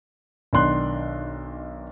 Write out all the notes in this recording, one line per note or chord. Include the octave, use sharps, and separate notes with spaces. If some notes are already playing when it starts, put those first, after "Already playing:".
B1 D#3 D4 C6 F#6